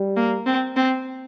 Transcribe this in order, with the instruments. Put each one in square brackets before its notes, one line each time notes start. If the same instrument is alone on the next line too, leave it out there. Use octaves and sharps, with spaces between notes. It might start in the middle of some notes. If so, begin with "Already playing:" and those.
Already playing: [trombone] G3
[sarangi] A#3
C4
C4